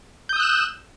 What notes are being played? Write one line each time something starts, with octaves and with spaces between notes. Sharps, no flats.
D#6 E6 F#6 G6 E7